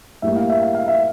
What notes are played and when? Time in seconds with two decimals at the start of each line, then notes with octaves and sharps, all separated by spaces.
0.22 A2 G3 A#3 E5
0.36 F5
0.50 E5
0.62 F5
0.75 F5
0.88 E5